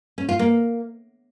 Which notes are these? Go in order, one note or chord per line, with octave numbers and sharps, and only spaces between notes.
C#4
F4
A#3